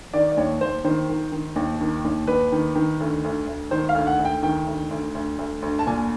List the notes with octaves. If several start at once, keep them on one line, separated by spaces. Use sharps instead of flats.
D#3 D5
D5
D#2 C#5
D#2 C5
D#3 C5
D#3
D#3
D#2
D#3
D#2
D#2 B4
D#3
D#3
D2
D2
D2
D#3 C5
F5
D2
F#5
D2
G5
D#3 G5
D2
D2
D2
D2
D2
A5
A#2 G#5